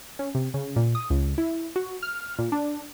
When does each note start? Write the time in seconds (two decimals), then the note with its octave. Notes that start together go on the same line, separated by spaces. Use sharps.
0.19 C#4
0.35 C3
0.54 C#3
0.76 A#2
0.95 D#6
1.10 C#2
1.38 E4
1.76 F#4
2.03 F6
2.39 A#2
2.52 D4